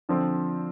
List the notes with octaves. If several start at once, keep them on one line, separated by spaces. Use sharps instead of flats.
D3 F3 C4